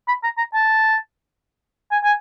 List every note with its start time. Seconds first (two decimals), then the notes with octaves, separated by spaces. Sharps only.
0.08 B5
0.24 A#5
0.38 A#5
0.54 A5
1.92 G#5
2.04 G#5